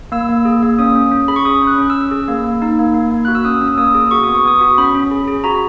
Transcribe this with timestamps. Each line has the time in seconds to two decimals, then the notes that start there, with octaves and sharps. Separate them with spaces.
0.12 A#3 E6
0.29 A#3
0.45 G#4
0.63 A#3
0.79 C#4 D#6
0.95 C#4
1.12 C#4
1.28 G#4 B5
1.36 C#6
1.45 C#4 D#6
1.62 C#4
1.67 F#6
1.78 C#4
1.90 E6
1.95 C#4
2.11 G#4
2.28 A#3
2.45 A#3
2.62 D#4
2.79 A#3
2.94 A#3
3.11 A#3
3.25 F#4 F#6
3.35 E6
3.45 C#4 D#6
3.61 C#4
3.68 E6
3.78 A#3 D#6
3.95 G#4
4.11 F#4 C#6
4.23 B3 D#6
4.35 C#6
4.45 B3 D#6
4.59 F#4 C#6
4.78 C#4 B5
4.95 C#4
5.11 G#4
5.28 G#4
5.44 F#4 A#5